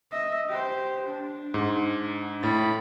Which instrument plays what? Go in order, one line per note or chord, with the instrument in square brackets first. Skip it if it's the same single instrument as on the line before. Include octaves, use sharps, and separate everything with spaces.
[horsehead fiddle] D#5 E5
G4 C5
D4
[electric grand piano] G#2 C6
[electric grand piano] A2 A6 [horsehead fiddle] B5